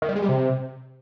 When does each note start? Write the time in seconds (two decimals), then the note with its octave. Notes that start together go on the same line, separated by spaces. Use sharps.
0.02 D#3
0.09 G3
0.15 G#3
0.22 G3
0.29 C3